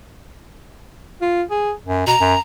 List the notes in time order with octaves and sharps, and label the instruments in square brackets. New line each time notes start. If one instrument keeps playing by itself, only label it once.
[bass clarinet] F4
G#4
F#2
[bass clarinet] B2 [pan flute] A#5
[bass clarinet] F#2